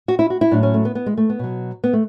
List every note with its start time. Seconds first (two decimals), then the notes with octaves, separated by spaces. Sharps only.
0.08 F#4
0.19 E4
0.30 F#4
0.41 E4
0.51 A2 F#3 D4
0.63 C#4
0.74 A3
0.85 B3
0.95 B3
1.06 G#3
1.17 A3
1.29 B3
1.39 B2 F#3
1.84 B3
1.93 A3